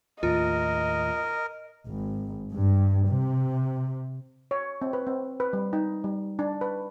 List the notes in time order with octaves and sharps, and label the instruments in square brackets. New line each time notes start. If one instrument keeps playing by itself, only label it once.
[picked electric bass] D#2 A2 [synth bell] F4 [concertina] A#4 [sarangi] D#5
[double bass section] G#1
G2
C3
[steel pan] C#5
C4
B4
C4
B4
G3
D#4
G3
D4
B4